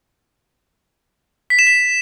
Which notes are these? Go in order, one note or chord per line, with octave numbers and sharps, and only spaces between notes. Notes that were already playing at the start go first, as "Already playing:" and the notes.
B6
E7
B6